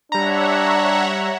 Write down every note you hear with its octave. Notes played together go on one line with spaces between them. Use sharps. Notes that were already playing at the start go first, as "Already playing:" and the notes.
G3 D4 C#5 E5 F#5 A#5